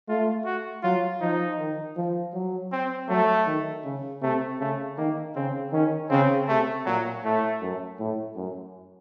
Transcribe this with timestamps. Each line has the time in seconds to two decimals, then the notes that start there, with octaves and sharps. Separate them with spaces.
0.09 A3 F4
0.45 F#4
0.83 F#3 F4
1.21 F3 D#4
1.59 D#3
1.97 F3
2.34 F#3
2.72 C4
3.09 F#3 A3
3.46 D#3
3.85 C#3
4.22 C3 A3
4.60 C#3 A3
4.97 D#3 A#3
5.36 C#3 C4
5.72 D#3 C#4
6.10 C#3 C4
6.48 C3 A3
6.86 A#2 F#3
7.24 A2 A3
7.61 F#2
7.99 A2
8.36 F#2